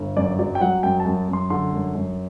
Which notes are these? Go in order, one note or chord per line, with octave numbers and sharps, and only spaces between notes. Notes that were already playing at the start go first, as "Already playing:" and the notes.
Already playing: G1
F#2 D5
F#3 D5
G5
F#3 F#5
F#2 G5
A5
F#2
F#2
C6
D3 C6
F#2
F#2